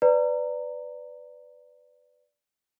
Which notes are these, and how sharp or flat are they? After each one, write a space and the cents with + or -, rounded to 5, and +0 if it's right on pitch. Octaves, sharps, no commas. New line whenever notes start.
B4 +15 D5 +0 A#5 -15